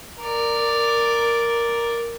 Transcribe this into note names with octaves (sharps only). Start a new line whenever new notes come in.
A#4 D5